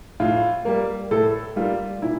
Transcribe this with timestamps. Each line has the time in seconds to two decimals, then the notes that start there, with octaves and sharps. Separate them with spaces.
0.20 A2 F4
0.65 G3 A#3
1.11 A2 A4
1.56 G3 A#3 F4
2.02 A#2 E4